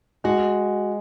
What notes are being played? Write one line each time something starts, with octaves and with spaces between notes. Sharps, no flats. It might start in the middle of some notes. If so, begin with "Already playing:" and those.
G#3 F#4